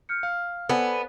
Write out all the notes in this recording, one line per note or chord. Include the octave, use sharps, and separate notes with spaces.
F6 G6 C#7
F5 F6
B3 A4 C5 D5 G#5